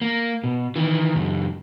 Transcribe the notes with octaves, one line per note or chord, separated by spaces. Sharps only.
A#3
B2
D#3 E3
C#2 F#2